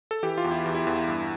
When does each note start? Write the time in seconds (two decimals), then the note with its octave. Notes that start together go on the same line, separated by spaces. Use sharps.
0.11 A4
0.23 E3 G4
0.38 F4
0.44 E2
0.51 E4
0.66 E2
0.75 E4
0.87 E2
1.08 G2